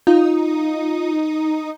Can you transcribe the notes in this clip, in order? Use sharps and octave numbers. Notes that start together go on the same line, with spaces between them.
D#4 F4